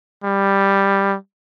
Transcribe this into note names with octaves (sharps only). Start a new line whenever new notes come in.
G3